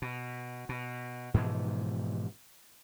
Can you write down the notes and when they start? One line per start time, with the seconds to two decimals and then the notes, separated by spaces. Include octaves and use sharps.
0.02 B2
0.69 B2
1.34 G#2 B2 E3 F3